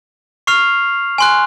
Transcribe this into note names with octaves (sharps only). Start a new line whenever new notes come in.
C#6 F6 C7 F7
G#5 C6 F#6